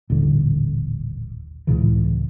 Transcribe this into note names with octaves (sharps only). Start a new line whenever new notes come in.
D#1 A1 D3
C#2 A2 C#3 E3